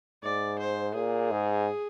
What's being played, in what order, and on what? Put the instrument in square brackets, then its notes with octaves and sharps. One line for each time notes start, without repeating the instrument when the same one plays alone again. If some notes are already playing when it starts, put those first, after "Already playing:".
[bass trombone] G#2 [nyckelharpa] D5
[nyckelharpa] C5
[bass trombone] A#2 [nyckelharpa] G#4
[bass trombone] G#2